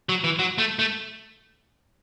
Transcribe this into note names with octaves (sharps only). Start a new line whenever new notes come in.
F#3
E3
F#3
A3
A3